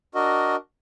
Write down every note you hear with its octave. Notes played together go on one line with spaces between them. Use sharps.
D4 F#4 A#4 D#5